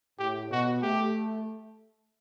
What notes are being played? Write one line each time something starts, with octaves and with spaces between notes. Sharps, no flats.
A2 G4
B2 F#4
A3 G4